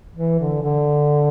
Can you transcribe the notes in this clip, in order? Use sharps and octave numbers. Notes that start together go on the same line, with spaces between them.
E3
D3
D3